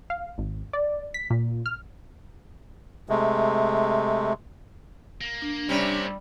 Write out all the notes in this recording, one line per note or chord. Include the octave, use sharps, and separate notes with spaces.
F5
G#1
D5
B6
A#2
F6
C3 G#3 A3
A#3
D4
C3 G3 A#3 C#4 E4